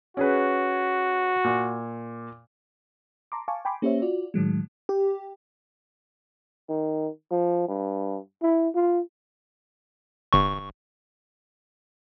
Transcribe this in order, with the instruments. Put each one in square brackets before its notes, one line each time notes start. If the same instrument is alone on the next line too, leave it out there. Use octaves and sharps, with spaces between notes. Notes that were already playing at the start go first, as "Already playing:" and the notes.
[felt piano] C#4 G#4 B4 [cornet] F#4
[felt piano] A#2
[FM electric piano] A5 A#5 C6 D6
F5 G#5 A5 C#6 D6
G5 G#5 B5 C6 D6
A#3 C#4 G4 C5 C#5 E5
F4 F#4 D5
A2 D#3 F#3 G#3
G4
[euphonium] D#3
F3
G2
E4
F4
[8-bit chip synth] G1 C#6